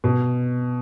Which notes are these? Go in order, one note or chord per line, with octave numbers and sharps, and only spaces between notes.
B2